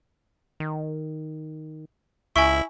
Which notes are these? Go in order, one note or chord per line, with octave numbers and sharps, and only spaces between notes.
D#3
C#2 E4 G#5 C#6